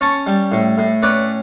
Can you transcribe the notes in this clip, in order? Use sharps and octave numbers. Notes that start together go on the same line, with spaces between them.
C#4 A5 C#6
G3
A2
A2
C#4 B4 D5